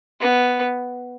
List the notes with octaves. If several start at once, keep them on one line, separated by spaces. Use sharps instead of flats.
B3